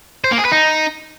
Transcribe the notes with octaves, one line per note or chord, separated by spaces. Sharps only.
C5
A#3
G#4
B4
D#4